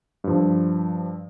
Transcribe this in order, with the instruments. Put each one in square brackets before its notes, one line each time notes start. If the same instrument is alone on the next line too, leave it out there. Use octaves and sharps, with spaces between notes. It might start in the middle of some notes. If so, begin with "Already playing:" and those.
[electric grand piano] G2 F3